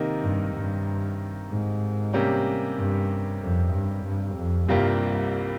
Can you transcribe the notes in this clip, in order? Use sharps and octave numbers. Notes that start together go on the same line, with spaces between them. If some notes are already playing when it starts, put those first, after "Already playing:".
Already playing: C3 D#3 A#3 D#4 A#4
G2
G2
G#2
C3 G3 A#3 C#4 G4
G2
F2
G2
G2
F2
C2 G2 C3 G3 A#3 F4